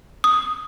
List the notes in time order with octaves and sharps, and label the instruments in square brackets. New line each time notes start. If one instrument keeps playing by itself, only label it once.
[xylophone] D#6